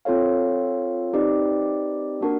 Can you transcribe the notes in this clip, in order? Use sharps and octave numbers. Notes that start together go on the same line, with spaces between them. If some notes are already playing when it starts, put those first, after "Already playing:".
C4 F4 A4 C#5 F5
C4 D#4 G4 B4 D5
A#3 D4 F#4 A#4